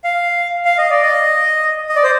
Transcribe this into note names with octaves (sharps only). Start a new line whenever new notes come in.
F5
F5
D#5
D5
D#5
D#5
D5
C5